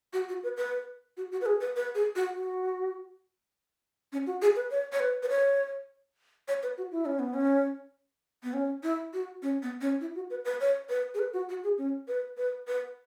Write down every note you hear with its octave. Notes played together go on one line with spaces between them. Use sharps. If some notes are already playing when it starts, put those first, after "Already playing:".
F#4
F#4
B4
B4
F#4
F#4
B4
G#4
B4
B4
G#4
F#4
F#4
C#4
F#4
G#4
B4
C#5
C#5
B4
B4
C#5
C#5
B4
F#4
E4
C#4
B3
C#4
B3
C#4
E4
F#4
C#4
B3
C#4
E4
F#4
B4
B4
C#5
B4
G#4
B4
F#4
F#4
G#4
C#4
B4
B4
B4